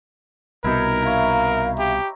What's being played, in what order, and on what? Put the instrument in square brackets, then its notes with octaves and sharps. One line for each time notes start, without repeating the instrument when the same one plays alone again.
[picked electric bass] C2 B2 [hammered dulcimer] D#4 E4 [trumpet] A#4
[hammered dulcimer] C#5 A#5 [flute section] E5 F5
[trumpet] G4